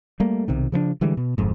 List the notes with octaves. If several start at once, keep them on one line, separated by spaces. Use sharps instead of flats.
G3 A3 A#3
B1 C3 D#3
C#3 F3 G3 D4
D3 E3 G3 G#3
B2
D1 G1 F2 G#2